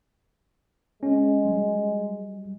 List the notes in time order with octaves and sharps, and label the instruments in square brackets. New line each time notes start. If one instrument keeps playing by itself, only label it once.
[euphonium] G#3 [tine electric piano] C#4
[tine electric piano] F#3 G3